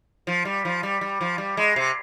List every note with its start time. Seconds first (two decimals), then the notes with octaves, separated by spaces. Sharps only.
0.27 F3
0.45 G3
0.65 F3
0.83 G3
1.01 G3
1.21 F3
1.38 G3
1.57 G#3
1.76 C3